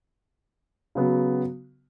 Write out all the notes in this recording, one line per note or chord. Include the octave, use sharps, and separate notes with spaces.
C#3 F#3 B3